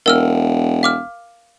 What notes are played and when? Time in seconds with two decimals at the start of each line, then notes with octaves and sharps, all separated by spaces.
0.06 E1 A#4 E6 F6
0.83 F5 D6 F6